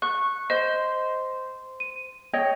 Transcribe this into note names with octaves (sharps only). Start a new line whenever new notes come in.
C#6 F#6
C5 D#5
D#7
C#5 D#5 G5